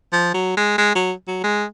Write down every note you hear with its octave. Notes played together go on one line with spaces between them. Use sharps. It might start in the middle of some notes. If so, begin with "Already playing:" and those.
F3
F#3
G#3
G#3
F#3
F#3
G#3